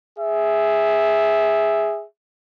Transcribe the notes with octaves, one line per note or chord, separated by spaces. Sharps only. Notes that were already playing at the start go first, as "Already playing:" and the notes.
G#4 E5